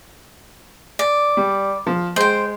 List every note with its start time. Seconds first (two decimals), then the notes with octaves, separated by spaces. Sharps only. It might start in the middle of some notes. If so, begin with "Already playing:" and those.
0.99 D5
1.37 G3
1.87 F3
2.16 G#3 C5 G5